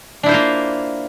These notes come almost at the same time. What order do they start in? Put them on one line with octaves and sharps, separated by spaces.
D4 E4 C5 F4 A#3